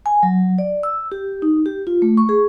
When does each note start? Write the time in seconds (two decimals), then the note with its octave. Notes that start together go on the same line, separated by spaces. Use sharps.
0.06 G#5
0.23 F#3
0.58 D5
0.83 E6
1.12 G4
1.42 D#4
1.66 G4
1.87 F4
2.02 A3
2.17 C#6
2.29 G#4